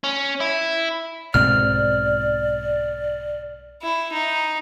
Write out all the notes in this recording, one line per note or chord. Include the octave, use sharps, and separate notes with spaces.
C#4
E4
B1 G#2 C4 D5 F6
E4
D#4